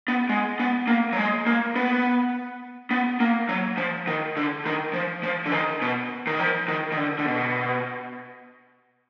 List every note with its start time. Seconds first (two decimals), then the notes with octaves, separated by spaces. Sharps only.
0.08 B3
0.29 G#3
0.59 B3
0.87 A#3
1.13 F#3
1.17 G#3
1.46 A#3
1.76 B3
2.91 B3
3.20 A#3
3.49 F#3
3.77 F3
4.07 D#3
4.37 D3
4.66 D#3
4.93 F3
5.23 F3
5.46 D3
5.52 D#3
5.82 B2
6.27 D#3
6.40 F3
6.68 D#3
6.92 D#3
6.97 D3
7.19 D3
7.26 B2